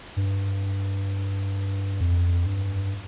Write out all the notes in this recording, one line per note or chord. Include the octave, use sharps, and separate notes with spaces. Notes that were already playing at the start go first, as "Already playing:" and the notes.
G2
F2
G2